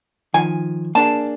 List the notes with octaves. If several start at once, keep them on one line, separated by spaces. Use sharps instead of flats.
D#3 F3 G#5
A#3 D4 G#4 A5